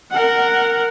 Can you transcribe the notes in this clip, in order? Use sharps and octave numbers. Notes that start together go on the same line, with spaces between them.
A#4 F#5